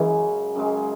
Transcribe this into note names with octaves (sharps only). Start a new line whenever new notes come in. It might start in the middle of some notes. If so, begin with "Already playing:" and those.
Already playing: F#2 C#3 E3 G#3
F#2 C#3 G#3